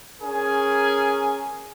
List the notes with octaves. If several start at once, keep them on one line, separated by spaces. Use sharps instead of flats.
C#4 G#4 A#4 G#5